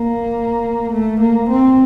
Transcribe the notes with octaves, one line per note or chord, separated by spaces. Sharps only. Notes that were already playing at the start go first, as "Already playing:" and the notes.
Already playing: A#3
A3
A#3
C4